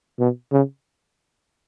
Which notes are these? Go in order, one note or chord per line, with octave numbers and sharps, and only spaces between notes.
B2
C#3